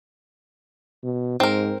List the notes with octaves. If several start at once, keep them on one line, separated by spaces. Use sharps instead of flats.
B2
G#2 C4 A#4